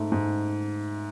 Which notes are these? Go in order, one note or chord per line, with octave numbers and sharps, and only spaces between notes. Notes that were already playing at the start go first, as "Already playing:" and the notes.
Already playing: G#2 A3
G#2